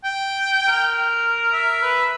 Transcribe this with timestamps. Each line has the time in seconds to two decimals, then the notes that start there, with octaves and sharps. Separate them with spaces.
0.04 G5
0.68 A#4
1.53 E5
1.82 B4